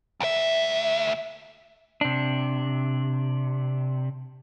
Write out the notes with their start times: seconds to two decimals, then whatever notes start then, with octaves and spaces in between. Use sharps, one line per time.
0.20 D2 E5
2.01 C3 D4